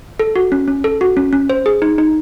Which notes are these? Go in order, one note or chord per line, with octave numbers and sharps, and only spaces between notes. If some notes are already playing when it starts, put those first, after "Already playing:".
A4
F#4
C#4
C#4
A4
F#4
C#4
C#4
C5
G#4
D#4
D#4